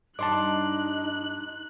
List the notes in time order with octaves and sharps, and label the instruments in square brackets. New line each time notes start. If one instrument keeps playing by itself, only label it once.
[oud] G2 D5 D#5 [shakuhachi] D#4 [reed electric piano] A5 C6 D6 [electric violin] F#6